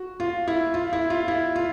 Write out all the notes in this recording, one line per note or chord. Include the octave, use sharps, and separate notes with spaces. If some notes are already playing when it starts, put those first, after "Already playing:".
Already playing: F#4
F4
E4
F4
E4
F4
E4
F4